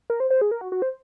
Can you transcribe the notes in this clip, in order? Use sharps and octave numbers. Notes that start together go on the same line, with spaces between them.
A#4
C5
C5
G#4
A#4
F#4
F#4
C5